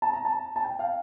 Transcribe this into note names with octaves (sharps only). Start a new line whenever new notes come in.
A5
A#5
A5
A5
G5
F5